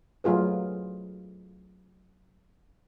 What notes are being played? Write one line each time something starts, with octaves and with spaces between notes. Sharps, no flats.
F#3 A3 F4 G#4 B4